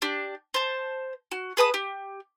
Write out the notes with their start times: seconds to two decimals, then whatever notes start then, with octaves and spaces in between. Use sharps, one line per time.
0.02 D4 G4
0.54 C5 A5
1.32 F#4
1.57 G#4 B4 A5 D#6
1.74 G4